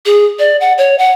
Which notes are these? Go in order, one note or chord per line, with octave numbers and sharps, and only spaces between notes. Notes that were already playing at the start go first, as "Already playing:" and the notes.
G#4
D5
F#5
C#5
F#5